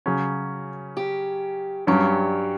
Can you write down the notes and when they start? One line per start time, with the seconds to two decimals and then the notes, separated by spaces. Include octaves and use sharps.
0.06 C#3 F#3 C#4
0.97 G4
1.87 G2 F#3 C#4 G4